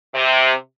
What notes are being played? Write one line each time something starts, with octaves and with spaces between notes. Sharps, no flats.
C3